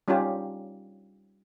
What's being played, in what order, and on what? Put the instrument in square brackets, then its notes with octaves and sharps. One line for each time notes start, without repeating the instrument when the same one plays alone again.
[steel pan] G3 C#4 D#4 F4 G4